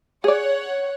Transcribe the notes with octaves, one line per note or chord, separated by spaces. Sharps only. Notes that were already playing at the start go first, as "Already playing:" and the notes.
G#4 C#5 D5 F#5